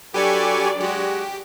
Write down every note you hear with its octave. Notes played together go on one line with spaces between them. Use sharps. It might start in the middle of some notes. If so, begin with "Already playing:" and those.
F#3 D4 G4 A4 B4 D5 G#5 C#6
G#3 F#4 G4